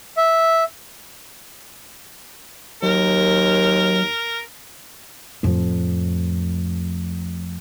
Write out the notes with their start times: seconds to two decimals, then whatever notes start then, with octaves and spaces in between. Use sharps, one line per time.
0.17 E5
2.83 D#2 F#3 A#4
5.43 F2 A2